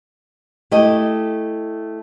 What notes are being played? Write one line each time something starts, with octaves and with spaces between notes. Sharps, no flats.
A3 E4 G4 D#5